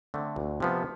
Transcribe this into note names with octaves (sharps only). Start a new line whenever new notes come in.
D3 A3 C4
D2
C3 F3 B3